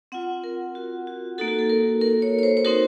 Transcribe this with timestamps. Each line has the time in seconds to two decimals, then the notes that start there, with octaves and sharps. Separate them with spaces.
0.12 C4 F4 F#5
0.44 A#4
0.75 F#4
1.07 F#4
1.38 A#3 D#4 F#4 A4
1.48 F#4
1.59 A4
1.70 A#4
2.01 A#4
2.22 C#5
2.39 C#5
2.43 C5
2.57 C5
2.65 C4 D#4 F#4 A#4